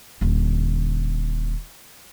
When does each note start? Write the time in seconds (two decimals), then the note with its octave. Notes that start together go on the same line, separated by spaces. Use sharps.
0.21 D#1 D3